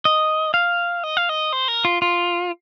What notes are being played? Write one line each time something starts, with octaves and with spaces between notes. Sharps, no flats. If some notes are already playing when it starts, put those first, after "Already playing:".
D#5
F5
D#5
F5
D#5
C5
A#4
F4
F4